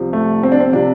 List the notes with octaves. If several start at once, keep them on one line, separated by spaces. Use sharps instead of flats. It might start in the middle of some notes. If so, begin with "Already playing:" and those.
Already playing: C2 C3 F3
A3
C4
D4
C4
C3 F3 D4